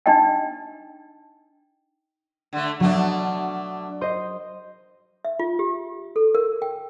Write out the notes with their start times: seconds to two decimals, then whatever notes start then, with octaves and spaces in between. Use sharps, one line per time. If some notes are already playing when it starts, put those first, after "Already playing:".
0.06 D4 D#4 D#5 G5
2.53 D3 A3
2.80 B2 F#3 A3 D4
4.01 C5 D#5
5.25 E5
5.40 F4
5.59 G4
6.16 A4
6.35 A#4
6.62 G5